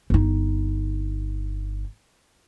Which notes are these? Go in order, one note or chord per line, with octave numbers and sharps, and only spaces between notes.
G1 D#4